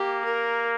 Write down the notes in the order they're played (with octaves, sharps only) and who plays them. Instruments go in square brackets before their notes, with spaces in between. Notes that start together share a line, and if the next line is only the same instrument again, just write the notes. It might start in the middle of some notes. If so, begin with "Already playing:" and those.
Already playing: [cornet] A#3 [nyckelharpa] G4
[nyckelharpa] A#4